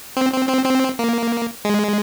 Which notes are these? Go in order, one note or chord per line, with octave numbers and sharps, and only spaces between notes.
C4
C4
C4
C4
A#3
G#3